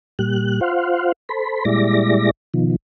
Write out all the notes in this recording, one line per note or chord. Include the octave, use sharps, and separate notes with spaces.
A#2 G3 F#6
F4 C5 F5 F#5
A4 C5 B5
A#2 G3 G#3 E4 D5 A#6
B2 D#3 F3